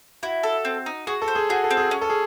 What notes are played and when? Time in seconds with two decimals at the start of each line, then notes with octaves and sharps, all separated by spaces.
0.23 E4 F#4
0.43 A4
0.65 C4
0.86 D#4
1.07 F#4 G#4
1.21 A4
1.28 C5
1.35 G#4
1.49 F#4 G#4
1.64 A4
1.71 C4
1.77 G#4
1.91 C#4
2.01 A4
2.09 G#4